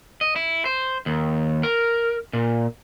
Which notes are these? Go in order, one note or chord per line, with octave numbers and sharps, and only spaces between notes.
D#5
E4
C5
D#2
A#4
A#2